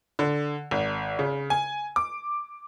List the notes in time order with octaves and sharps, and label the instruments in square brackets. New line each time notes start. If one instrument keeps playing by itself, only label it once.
[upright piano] D3
G#1
C#3
G#5
D6